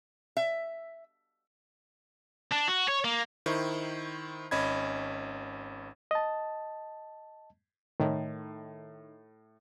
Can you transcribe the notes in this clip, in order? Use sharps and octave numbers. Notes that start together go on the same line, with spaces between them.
E5
D4
F#4
C#5
A#3
D#3 E4 C5 C#6
G#1 C#4 D#5 B5 G#6
D#5 A5
A2 D#3